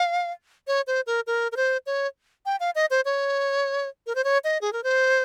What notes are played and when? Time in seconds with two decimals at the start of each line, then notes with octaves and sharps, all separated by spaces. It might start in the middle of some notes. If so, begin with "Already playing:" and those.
Already playing: F5
0.67 C#5
0.87 C5
1.07 A#4
1.27 A#4
1.52 A#4
1.56 C5
1.86 C#5
2.46 G5
2.60 F5
2.75 D#5
2.90 C5
3.05 C#5
4.06 A#4
4.15 C5
4.24 C#5
4.44 D#5
4.61 G#4
4.73 A#4
4.83 C5